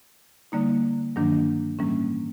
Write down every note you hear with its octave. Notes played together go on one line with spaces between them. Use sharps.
D3 G3 A#3 D#4
G2 D#3 F#3 A#3 D4
A2 E3 G3 A#3 C#4